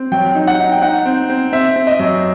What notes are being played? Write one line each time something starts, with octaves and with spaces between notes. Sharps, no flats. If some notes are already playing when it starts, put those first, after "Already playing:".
Already playing: C4
F#3 G5
D#4
F#5
D#4
G5
D#4 F#5
C4
C4
C4 E5
C4
D#5
F#2